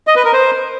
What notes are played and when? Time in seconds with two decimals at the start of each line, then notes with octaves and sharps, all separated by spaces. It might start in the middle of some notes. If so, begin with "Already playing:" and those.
0.07 D#5
0.16 B4
0.24 A#4
0.33 C5